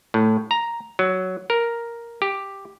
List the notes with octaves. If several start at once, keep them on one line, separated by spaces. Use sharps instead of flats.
A2
A#5
F#3
A#4
G4